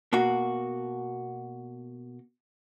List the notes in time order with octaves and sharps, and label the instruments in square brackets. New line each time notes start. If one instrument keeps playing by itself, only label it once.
[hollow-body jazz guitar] B2 A#3 F#4